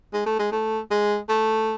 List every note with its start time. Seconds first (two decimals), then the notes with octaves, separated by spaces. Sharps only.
0.13 G#3
0.26 A3
0.39 G#3
0.52 A3
0.90 G#3
1.29 A3